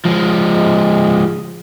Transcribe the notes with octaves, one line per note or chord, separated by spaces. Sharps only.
F3 G#3